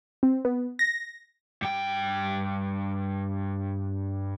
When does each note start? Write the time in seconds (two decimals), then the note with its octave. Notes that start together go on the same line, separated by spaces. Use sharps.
0.23 C4
0.45 B3
0.79 A#6
1.62 G2 G5